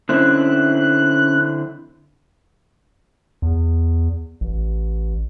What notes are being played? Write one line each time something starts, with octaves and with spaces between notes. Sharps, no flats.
D3 C4 C#4 E4 F#6
E2
A1